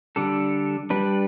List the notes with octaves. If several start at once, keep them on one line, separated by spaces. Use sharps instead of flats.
D3 G3 D4 A4
G3 D4 B4